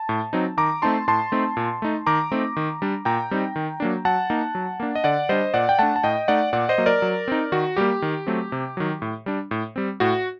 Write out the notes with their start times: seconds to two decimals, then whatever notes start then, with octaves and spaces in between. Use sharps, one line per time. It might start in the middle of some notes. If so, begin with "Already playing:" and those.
Already playing: A5
0.09 A2
0.33 F#3 C4 D#4
0.57 D#3 A#5 D6
0.82 A3 C4 D#4 A5 C6
1.08 A2 A5 C6
1.32 A3 C4 D#4
1.57 A#2
1.82 A3 D#4
2.06 D#3 A#5 D6
2.32 A3 C4 D#4
2.56 D#3
2.82 G3 D4
3.05 A#2 G5 A#5
3.31 G3 C4 D#4
3.56 D#3
3.80 F#3 A#3 D4
4.05 F#3 F#5 A5
4.30 A#3 D#4
4.55 F#3
4.80 A#3 D4
4.95 D#5
5.04 D3 D5 F#5
5.29 G3 D4 C5 D#5
5.54 A#2 D5 F#5
5.69 G5
5.79 A3 D4 F#5 A5
5.96 A5
6.03 A2 D#5 G5
6.28 A3 D#4 D5 F#5
6.53 A#2 D5 F#5
6.69 C5 D#5
6.78 F#3 A#3
6.86 A#4 D5
7.02 F#3
7.28 C4 D#4
7.52 D#3 F#4
7.77 G3 A#3 G4
8.02 D#3
8.27 F#3 A3 C4
8.52 C3
8.77 D#3 F#3
9.02 A2
9.26 G3 D4
9.51 A2
9.76 G3 C4
10.00 A2 F#4